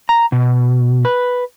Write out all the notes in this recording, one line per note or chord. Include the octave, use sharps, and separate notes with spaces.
A#5
B2
B4